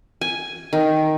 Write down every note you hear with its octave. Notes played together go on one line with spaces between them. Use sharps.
G#5
D#3